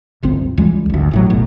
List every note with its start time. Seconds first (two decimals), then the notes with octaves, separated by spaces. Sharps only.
0.22 D1 G1 C2 C4
0.58 C#2 E3 G3 G#3
0.90 G#1 D2
1.11 A1 A2 F#3
1.30 F#1 B1 A2